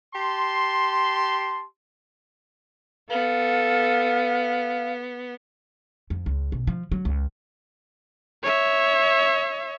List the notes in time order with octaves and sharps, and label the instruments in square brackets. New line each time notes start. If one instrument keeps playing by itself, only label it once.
[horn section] G4 A5 C6
[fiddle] B3 [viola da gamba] A4 [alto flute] F5
[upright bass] F2
C#2
B1
F3
F#3
C#2
[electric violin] C#5 E5